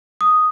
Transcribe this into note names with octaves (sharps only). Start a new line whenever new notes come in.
D#6